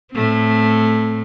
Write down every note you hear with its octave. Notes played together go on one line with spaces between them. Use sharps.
A2 A3 C4